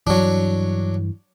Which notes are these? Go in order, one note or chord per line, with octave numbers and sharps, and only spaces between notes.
G2 E3 F#3 D4